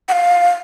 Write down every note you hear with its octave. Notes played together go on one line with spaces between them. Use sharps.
F#5
F5